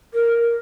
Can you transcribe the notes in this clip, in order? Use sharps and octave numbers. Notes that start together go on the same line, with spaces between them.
A#4